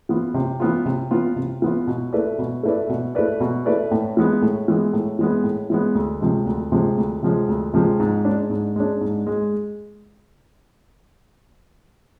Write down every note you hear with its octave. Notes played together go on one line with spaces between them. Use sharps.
E3 B3 F4
C3
E3 B3 F4
C3
E3 B3 F4
C3
E3 B3 F4
B2
A3 E4 B4 D5
B2
A3 E4 B4 D5
B2
A3 E4 B4 D5
B2
A3 E4 B4 D5
A2
E3 G#3 B3
A2
E3 G#3 B3
A2
E3 G#3 B3
A2
E3 G#3 B3
D2
C3 F3 G#3
D2
C3 F3 G#3
D2
C3 F3 G#3
D2
C3 F3 G#3
G#2
G#3 D4
G#2
G#3 D4
G#2
G#3